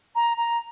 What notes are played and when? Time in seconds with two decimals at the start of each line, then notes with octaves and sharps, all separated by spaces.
0.15 A#5
0.37 A#5